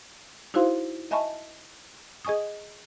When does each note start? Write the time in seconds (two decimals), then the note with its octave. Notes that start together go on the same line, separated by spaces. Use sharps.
0.54 D#4 E4 F#4 C5 F5 C6
1.11 D#5 E5 G#5 A5 B5 C#6
2.25 G#4 D#5 G#5 C#6 D#6